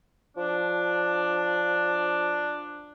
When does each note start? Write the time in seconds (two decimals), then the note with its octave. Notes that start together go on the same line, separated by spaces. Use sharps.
0.37 F3 D4